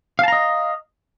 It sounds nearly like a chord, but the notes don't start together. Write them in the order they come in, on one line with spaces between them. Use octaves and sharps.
F5 A5 A#5 D#5